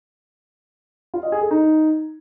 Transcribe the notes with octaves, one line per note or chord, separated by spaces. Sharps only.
F4
D#5
G#4
A4
D#4